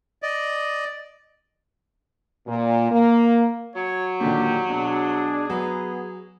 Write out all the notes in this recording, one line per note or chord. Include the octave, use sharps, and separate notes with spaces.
D5 D#5
A#2
A#3
F#3 C#5
A#2 D3 D#3 D4 G4
B2 D4 G#4
F#3 B3